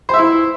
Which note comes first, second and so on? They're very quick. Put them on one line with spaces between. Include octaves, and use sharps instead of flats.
C5 E5 E4